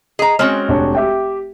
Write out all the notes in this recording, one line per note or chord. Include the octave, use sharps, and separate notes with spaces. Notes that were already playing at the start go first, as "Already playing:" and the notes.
G#4 D#5 A#5
G#3 C4 C#4 F#4 F6
F1 D4 C#5
G4 E5 G5